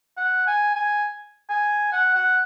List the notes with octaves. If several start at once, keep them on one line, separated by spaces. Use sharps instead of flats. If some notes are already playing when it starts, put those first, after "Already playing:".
F#5
G#5
G#5
G#5
F#5
F#5